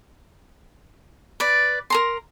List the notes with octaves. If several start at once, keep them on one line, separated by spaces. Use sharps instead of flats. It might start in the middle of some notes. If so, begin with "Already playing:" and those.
B4 D5
A#4 A#5 C6